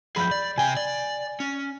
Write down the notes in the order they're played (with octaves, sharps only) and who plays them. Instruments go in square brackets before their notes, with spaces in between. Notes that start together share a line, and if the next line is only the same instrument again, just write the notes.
[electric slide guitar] F#2 F3 G#4 [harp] B5 G6
[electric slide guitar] D5
[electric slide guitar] C3 G5 [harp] G#5
[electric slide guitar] D5
C#4